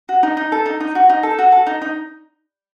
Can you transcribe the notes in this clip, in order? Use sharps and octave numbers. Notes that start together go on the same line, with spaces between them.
F#4
D#4
D#4
A4
D#4
D#4
F#4
D#4
A4
F#4
A4
D#4
D#4